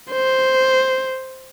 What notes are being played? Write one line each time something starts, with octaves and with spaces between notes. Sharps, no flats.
C5